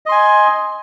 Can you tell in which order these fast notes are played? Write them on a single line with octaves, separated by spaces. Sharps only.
D#5 C6 G#5